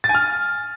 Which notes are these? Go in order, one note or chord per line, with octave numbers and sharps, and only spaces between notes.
A6
G#5
F6